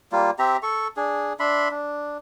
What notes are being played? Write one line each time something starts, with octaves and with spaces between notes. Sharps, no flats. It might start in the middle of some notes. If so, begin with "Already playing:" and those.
G3 A#3 F4
C4 G4 E5 A#5
A4 C#6
D4 G#4
D4 E5 B5 C6
D4